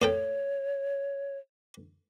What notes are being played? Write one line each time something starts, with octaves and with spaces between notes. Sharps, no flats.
A2 A4 C#5 G5